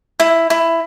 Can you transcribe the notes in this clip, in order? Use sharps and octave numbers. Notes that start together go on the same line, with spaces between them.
E4
E4